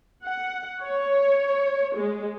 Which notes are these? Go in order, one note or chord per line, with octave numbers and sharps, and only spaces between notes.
F#5
C#5
G#3